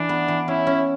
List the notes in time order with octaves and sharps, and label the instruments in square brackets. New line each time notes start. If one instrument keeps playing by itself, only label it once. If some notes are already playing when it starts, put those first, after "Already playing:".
Already playing: [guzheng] E3 [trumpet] D4
[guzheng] B3
E3
[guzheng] C#4 [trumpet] E4
[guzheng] C#4